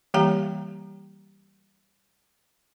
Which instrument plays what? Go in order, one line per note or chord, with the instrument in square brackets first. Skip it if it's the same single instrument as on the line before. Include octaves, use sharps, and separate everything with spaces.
[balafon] E3 G3 A#3 G4 F5 A#5